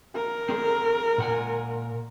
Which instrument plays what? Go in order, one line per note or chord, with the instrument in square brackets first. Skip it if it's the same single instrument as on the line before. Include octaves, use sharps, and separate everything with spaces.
[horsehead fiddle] A#4
[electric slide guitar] C4 G#4 A4
A#2 F#5 G#5